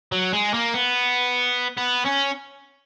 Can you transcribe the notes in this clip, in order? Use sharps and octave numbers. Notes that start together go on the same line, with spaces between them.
F#3
G#3
A#3
B3
B3
C#4